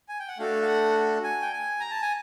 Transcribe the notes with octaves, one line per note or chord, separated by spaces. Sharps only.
G#5
G5
F#5
A3 D4 F#4 A4 F5
F5
F#5
G#5
G5
G#5
A#5
A5
G#5